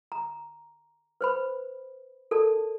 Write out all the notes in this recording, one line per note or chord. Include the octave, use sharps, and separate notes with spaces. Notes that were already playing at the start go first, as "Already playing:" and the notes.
A#5
B4 C5 B5
A4 A#4 D5 A5